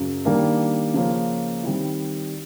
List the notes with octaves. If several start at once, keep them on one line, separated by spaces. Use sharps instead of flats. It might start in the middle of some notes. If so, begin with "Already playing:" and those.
Already playing: F#2 C#3 F#3
D#3 G3 A#3 D4
C#3 F3 A#3 C#4
D#3 G3 C4 E4